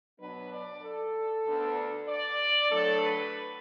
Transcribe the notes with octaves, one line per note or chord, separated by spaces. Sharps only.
B2 F#3 B3 D4 B4
D5
A4
D2 D3 B3 D4
D5
A2 F#3 A3 D4 A4
B4